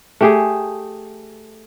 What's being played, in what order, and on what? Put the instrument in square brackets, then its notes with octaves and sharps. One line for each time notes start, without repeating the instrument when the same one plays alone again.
[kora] A3 G4 G#4